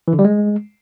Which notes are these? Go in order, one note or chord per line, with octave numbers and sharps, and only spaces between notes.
E3
D3
G3
G#3